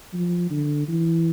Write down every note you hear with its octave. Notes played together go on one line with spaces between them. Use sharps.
F3
D3
E3